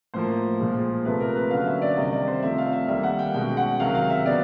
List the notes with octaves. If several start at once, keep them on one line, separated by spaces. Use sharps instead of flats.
A2 F3 A#3 C5
A#2 F3 G#3
C3 F3 A3 B4
A#4
B4
D3 F#3 A#3 C#4 F5
E5
D5
C3 D#3 G3 D#5
D5
C5
C3 F3 A3 C4 E5
F5
E5
D#3 G3 A#3 E5
F#5
G5
B2 G#3 C#4 G5
F#5
C3 D#3 F#3 F5
F5
E5
C#3 F#3 B3 D5